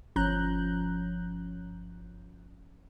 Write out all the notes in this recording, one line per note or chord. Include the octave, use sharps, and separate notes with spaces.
G1 F3 C#4 A#5 F#6 G6